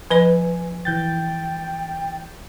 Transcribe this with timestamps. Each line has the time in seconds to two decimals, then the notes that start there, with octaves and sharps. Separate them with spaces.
0.10 F3 B4 D#5 G#5
0.85 E3 G5 G6 A6